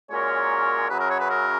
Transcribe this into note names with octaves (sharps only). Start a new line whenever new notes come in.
A#2 G#3 C#4 F#4 A#4 C#5
F#2 C#3 F#3 B4
A#4
C#5
B4
A#4